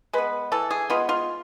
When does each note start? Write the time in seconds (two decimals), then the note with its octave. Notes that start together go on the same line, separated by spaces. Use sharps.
0.13 G#3 B3 B4
0.52 E3 A4
0.71 G#4
0.90 G#3 B3 F4
1.09 F4